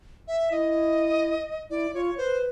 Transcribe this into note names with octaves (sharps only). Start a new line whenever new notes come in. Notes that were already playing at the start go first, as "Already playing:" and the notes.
E5
E4 D#5
E4 D5
F4 C#5
B4 C5